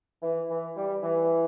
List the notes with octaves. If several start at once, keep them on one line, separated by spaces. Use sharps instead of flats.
E3
E3
G3
E3